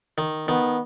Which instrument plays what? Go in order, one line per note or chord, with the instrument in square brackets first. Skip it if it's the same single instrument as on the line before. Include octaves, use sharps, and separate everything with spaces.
[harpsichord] D#3
[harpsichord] D#3 [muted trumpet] B3